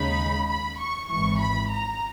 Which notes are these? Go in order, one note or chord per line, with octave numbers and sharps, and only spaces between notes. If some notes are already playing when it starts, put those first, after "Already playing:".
Already playing: D#2 C#3 G#3 D#4 B5
B5
C#6
G#1 G#2 E3 C#6
B5
A#5